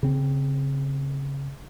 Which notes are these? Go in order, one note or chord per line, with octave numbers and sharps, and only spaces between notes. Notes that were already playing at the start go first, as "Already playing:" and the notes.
C#3 C4